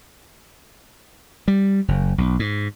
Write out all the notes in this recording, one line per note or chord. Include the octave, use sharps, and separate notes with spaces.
G3
F#1
B1
G#2